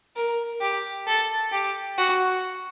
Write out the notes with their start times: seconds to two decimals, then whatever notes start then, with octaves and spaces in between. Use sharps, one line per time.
0.16 A#4
0.61 G4
1.07 A4
1.52 G4
1.98 F#4